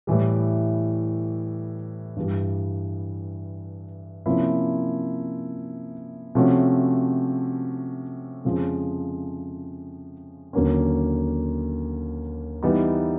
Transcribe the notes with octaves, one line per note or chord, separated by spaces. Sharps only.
A2 E3 G3
G2 E3 G3
C3 F3 A#3 C#4 E4
C3 F3 A3 C#4 F#4
F2 C#3 F3 G#3
D#2 D3 F#3 A#3 C#4
E3 G3 B3 D#4